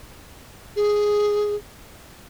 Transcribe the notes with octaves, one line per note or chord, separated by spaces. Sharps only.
G#4